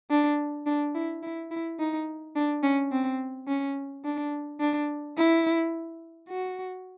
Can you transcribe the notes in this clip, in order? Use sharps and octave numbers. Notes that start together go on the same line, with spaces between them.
D4
D4
E4
E4
E4
D#4
D4
C#4
C4
C#4
D4
D4
E4
F#4